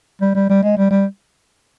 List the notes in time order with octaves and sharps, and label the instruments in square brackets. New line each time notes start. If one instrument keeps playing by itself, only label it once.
[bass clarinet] G3
G3
G3
G#3
G3
G3